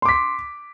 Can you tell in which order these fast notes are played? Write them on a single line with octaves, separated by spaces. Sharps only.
C6 D6 B6